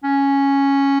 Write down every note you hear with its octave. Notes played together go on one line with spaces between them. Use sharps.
C#4